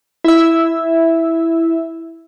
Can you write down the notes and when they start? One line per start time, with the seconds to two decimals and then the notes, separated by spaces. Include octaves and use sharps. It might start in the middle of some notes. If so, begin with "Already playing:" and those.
0.24 E4 E5